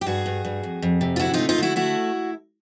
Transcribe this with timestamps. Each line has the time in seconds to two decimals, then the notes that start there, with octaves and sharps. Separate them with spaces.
0.01 G4
0.06 G2 F#4 G#4
0.26 G2
0.44 G2
0.63 F2
0.82 F2
1.01 C3
1.16 F4
1.19 D3 E4 F#4
1.34 A3 D#4 F4
1.49 D#4 F4
1.58 D3 E4 F#4
1.76 A3 E4 F#4